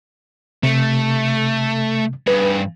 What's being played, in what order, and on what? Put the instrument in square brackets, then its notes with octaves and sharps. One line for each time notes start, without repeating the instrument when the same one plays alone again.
[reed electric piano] C3 [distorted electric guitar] A3
[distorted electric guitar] G2 G#4 [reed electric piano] B4